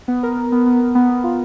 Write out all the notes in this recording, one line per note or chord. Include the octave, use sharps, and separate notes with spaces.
B3
A#4
B3
B3
B3
B3
B3
B3
F4